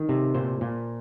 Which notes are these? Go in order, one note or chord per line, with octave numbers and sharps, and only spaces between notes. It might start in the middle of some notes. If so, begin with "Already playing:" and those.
Already playing: D#3
C3
A#2 C5
A#2